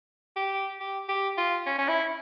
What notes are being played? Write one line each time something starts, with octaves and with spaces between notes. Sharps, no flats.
G4
G4
G4
F4
C#4
C#4
E4